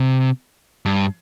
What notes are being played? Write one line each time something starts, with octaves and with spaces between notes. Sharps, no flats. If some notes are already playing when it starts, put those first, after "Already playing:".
Already playing: C3
G2